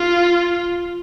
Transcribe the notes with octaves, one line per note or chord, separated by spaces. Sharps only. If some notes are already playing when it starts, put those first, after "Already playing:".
Already playing: F4